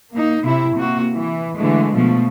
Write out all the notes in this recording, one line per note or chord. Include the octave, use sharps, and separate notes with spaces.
A#3 D#4
C3 E4
C3 A#3 F#4
E3
D3 E3 G#3 A3
B2 F3 A3